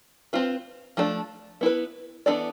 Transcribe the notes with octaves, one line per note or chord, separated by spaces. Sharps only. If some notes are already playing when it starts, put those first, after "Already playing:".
C4 F4 B4
F3 A3 D4 A4
B3 E4 B4
E3 B3 D4 A4 D5